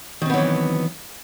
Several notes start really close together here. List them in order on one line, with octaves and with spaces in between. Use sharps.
D#3 C4 B3 F#3 E3